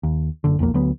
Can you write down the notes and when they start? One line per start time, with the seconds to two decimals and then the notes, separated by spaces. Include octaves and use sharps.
0.03 D#2
0.44 F#1 D3
0.59 E1 B1 F2 A#3
0.74 D2 F#3 B3